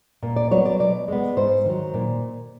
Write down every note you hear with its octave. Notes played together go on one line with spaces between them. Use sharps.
A#2
D5
F#3 B3 C#5
D5
B2 D5
G#3 B3
G#2 C5
D#3 F#3
A#2